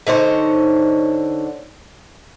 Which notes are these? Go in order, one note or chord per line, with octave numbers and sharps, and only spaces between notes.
D3 D#4 C5 C#5